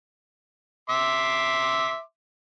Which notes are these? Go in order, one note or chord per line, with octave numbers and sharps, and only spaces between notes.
E5 C6 D6